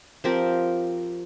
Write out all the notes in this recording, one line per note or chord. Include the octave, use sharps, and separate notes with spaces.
F3 C4 G4 A#4